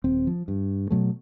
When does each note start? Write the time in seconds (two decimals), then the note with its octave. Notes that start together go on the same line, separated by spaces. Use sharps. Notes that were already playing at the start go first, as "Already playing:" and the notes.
0.04 D#1 C4
0.27 F3
0.48 G2
0.90 B2 F#3 A3